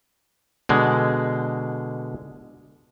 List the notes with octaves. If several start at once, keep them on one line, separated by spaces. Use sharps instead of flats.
B2 D3 G#3